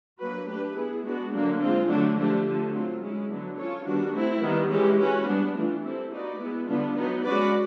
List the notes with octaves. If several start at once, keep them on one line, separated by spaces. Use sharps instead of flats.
F#3 A#3 D4 F#4 B4
A3 D4 G4 B4
B3 E4 G#4
G#3 B3 D4 F#4
D3 F#3 A#3 D4
G#3 C4 F4
D3 F#3 A3 D4
D3 F3 A3 D4 G4
D3 F3 A3
F#3 A3 C4 F4
G#3 C#4 E4
D3 F#3 B3
C#4 F4 A4 C#5
D#3 G3 B3 D4 F#4
A3 C4 E4
D#3 G3 B3
E3 G#3 C#4 E4 G4
C#4 F#4 B4
G3 B3 D4
E3 A3 D4 F4
G3 C4 E4 A4
A#3 D#4 F#4 B4 D5
G#3 B3 E4
D3 G3 B3 D4 F4
F#3 B3 D#4
G#3 C#4 F#4 B4 D5